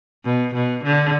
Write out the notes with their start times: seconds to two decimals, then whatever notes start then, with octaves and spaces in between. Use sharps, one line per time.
0.25 B2
0.54 B2
0.84 D3